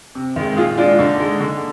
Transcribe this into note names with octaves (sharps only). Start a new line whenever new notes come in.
C3
D#3 G#3
A#2 F4 G#4
G#3 D4 F4
D3 D#4
G#3
D3